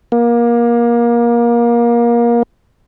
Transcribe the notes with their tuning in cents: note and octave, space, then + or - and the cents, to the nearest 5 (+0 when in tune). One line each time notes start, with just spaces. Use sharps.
A#3 +25